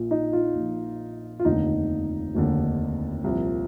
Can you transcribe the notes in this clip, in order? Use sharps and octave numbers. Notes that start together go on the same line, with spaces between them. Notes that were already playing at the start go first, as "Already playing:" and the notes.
Already playing: A#1 A#2
D#4
F4
A#1 A#2 F3
F4
F1 D#2 D3 D#4
F1 D#2 D3
C2 A#2 F3